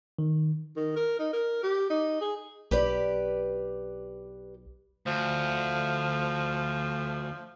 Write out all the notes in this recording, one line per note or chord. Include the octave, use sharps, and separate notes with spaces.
D#3
D#3
A#4
D#4
A#4
G4
D#4
G#4
B1 G4 B4 D5
D2 F3